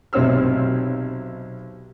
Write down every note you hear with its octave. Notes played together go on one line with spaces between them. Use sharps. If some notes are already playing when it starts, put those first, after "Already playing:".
B1 C3 C4 C#5 E6 F6